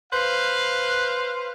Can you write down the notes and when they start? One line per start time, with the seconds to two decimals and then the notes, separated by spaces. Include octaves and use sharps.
0.12 B4 C5 F5